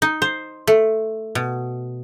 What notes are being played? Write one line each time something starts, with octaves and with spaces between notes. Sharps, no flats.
D#4
C5
A3
B2